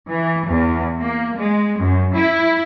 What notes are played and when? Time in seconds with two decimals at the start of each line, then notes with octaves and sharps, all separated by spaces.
0.11 E3
0.48 E2
1.01 A#3
1.36 G#3
1.80 F#2
2.14 E4